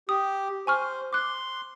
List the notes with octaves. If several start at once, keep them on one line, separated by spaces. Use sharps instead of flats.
G4 D#6
C5 G#5 C#6 F6
C6 D6 F#6